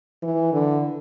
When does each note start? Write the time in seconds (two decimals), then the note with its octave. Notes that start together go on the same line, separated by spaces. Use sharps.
0.23 E3
0.53 D3